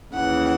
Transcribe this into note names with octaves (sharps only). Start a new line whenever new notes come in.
D#2 C#3 E3 F#5